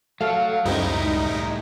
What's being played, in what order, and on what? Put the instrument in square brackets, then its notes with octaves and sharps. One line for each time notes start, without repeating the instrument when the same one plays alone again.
[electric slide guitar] F#3 [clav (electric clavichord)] A3 [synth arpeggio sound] A4 F5
[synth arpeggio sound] C#2 [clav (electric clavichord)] F#2 C4 [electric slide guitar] A2 G3 E4 [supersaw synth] D#4